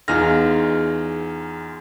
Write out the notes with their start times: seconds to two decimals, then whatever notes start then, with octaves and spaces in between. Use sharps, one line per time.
0.08 E2 D#4 F4 G#4 F6 A#6